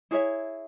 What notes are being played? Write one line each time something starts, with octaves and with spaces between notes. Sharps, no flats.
E4 G#4 C#5 E5